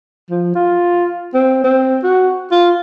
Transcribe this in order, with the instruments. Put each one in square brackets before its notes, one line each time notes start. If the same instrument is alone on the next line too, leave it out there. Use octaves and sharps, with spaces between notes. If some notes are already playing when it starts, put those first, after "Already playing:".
[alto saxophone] F3
F4
C4
C4
F#4
F4